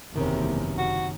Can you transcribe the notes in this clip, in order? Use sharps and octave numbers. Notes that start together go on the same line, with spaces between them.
F#1 E2 C3 D#3 C#4
F#4